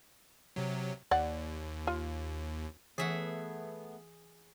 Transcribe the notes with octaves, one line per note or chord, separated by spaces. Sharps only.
C3 F#3
D#2 D5 F#5
F4
E3 A3 B3 G#4 E5 F#5